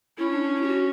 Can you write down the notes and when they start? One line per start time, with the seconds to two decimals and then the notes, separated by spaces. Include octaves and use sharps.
0.18 C#4 E4
0.31 D4
0.43 D4
0.55 E4
0.62 G4
0.68 F#4